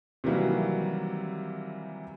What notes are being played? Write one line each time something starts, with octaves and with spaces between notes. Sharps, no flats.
C3 D#3 E3 F#3 G3 A#3